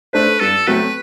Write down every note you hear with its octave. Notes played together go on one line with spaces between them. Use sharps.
A3 D4 A4 B4 C5
G2 A4
F#3 A3 C4 F#4 B4